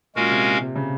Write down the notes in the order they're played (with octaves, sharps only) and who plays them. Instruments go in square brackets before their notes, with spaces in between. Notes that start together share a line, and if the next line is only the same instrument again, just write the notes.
[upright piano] A#2 [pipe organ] G#3 C#4 F#4 A#4 F5
[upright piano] C3
C3
C#3